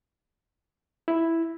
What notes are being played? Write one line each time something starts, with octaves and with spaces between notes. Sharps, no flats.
E4